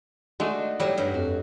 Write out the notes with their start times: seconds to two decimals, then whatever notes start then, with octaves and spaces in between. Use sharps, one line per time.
0.40 G#3 A3 D4 D#4 F#4
0.80 A2 F#3 G3
0.97 G2
1.14 F2 F#4